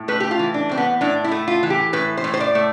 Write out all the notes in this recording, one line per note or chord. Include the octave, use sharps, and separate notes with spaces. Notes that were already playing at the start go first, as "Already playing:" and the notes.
Already playing: A2
A3 B4
G4
F4
E3
D4
A2 C4
B3
A2 D4
E4
A3
F4
E3
G4
A2 B4
C5
A2
C5
D5
A3